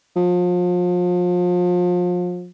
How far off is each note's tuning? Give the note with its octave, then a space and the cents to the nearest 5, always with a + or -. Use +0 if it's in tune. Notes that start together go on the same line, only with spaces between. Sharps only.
F3 +35